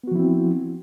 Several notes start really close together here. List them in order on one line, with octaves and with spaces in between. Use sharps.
B3 F#4 F3 E4 C4